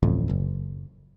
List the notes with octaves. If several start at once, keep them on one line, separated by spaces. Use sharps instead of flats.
D1 A1 F2
F#1